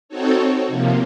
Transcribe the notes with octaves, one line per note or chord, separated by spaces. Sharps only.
C4 D#4 F#4 A4 C#5
C3 F3 A#3